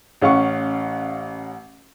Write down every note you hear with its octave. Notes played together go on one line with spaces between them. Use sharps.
A1 C#4 F5 F#5 C#6